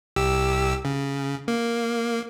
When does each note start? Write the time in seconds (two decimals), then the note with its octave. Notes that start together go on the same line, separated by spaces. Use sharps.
0.16 C2 G4 E6
0.85 C#3
1.48 A#3